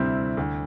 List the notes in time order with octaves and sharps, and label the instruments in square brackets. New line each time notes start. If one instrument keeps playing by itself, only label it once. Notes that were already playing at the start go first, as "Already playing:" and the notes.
Already playing: [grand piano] D2 C3 G3 C4 E4
D2